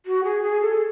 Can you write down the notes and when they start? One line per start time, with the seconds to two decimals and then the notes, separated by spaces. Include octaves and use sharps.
0.06 F#4
0.24 G#4
0.43 G#4
0.61 A4